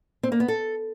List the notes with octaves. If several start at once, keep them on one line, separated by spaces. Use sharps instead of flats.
C4
A#3
B3
A4